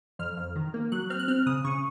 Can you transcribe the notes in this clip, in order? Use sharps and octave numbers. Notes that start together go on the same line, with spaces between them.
F2 F6
F2
D#3
A#3
F#3 F#6
C4 F6
F#6
C4 F6
C#3 D#6
C#3 C#6